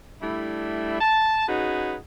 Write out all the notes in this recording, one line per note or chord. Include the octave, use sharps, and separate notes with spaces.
G3 A3 D4 E4
A5
C#4 D#4 F#4 G#4 B4